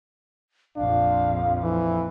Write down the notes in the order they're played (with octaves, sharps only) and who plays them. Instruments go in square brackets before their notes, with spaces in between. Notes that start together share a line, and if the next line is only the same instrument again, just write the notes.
[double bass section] A#1 F2 [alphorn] D4 [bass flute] F5
[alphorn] E3 [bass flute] F3